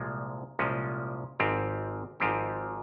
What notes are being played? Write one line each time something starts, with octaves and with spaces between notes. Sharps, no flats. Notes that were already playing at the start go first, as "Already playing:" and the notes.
Already playing: C2 A#2 F3 G#3
C2 A#2 F3 G#3 C#4
G#1 G#2 F3 C4 G4
G#1 G#2 F3 C4 G4